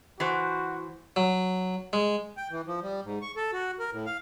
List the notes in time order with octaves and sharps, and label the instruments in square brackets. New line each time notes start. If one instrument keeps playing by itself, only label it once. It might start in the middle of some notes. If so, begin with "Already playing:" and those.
[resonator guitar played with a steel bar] E3 C5 [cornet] F#4
[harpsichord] F#3
G#3
[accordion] G5
E3
F3
G3
G#2
C#6
A4
F#4
A#4
A2
F5